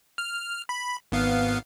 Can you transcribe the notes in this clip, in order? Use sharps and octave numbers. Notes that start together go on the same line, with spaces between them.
F6
B5
G#1 B3 F5